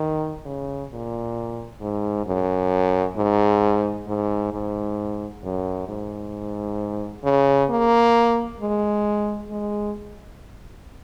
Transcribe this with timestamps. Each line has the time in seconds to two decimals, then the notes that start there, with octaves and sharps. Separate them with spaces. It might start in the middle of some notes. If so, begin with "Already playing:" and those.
Already playing: D#3
0.45 C#3
0.91 A#2
1.81 G#2
2.26 F#2
3.17 G#2
4.07 G#2
4.53 G#2
5.43 F#2
5.89 G#2
7.24 C#3
7.70 A#3
8.60 G#3
9.51 G#3